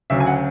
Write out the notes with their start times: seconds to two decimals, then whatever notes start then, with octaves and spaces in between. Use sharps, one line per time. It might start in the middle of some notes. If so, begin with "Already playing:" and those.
0.10 D2 C#3 F#3 E5
0.20 G#5
0.26 F#5